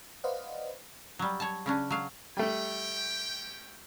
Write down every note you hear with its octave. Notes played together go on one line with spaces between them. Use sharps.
B4 C5 D5 D#5 F5 F#5
F#3 G3
C#5 A5
C#3 C#4 D4
F#3 F5
G3 A3 C#4 G5